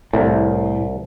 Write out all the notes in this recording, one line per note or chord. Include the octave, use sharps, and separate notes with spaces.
C2 A2